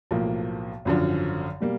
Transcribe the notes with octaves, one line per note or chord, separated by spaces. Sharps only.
B1 A2 F3 A#3
G#1 F#2 D3 F3
B2 G3 A#3